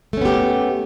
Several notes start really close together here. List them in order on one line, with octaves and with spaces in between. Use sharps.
A3 C#4 B3 G4